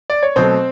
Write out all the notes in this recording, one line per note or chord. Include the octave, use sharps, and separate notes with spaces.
D5
C#5
B2 F#3 A3 C4 C5